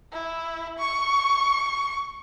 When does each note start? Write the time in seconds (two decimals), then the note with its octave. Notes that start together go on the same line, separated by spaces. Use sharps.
0.13 E4
0.79 C#6